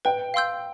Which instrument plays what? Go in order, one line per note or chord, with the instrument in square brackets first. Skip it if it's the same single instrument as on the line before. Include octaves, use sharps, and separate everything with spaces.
[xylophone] B4 [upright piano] G5
[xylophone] F5 C6 E6 G6